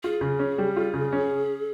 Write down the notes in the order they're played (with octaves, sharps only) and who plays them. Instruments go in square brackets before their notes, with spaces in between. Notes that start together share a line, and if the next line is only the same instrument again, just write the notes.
[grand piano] F4 [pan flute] G#4
[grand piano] C#3
C#4
G3
F4
C#3
C#4